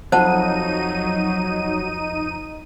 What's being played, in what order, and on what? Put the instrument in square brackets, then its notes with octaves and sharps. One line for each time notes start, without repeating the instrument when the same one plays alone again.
[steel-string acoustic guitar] F2 [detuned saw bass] F#3 [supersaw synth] D#4 D#7 [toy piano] C5 F#5 A5